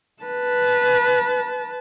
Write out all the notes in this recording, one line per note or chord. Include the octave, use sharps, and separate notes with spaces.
B4 A5